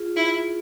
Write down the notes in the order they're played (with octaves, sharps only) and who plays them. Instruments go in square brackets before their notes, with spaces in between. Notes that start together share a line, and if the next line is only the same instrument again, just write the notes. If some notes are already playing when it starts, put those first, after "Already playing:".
Already playing: [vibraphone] F4 G#4
[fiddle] E4